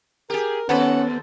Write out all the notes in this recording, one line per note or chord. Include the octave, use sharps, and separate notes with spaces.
G4 G#4 A#4
D#2 B3 C#4 A4 C5 F#5